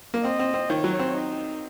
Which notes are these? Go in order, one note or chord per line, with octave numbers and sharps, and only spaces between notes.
A#3
C4 D#5
C4
C4
D#3 C#5
F#3
C4
D#4